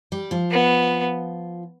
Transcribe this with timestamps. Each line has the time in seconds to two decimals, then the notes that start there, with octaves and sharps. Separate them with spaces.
0.12 G3 G4
0.31 F3 F4
0.51 B3